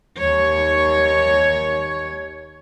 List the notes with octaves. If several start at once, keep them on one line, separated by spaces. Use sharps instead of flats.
D#2 C#5